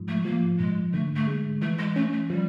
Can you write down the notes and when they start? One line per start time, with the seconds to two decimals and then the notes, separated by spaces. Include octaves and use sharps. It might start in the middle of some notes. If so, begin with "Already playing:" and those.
Already playing: G#2 F3
0.08 A3
0.25 F3 A#3
0.59 G#2 G#3
0.93 D3 A3
1.16 A3
1.27 G#3
1.62 E3 A3
1.78 G#3
1.96 A3 C#4
2.13 A3
2.30 F3 G3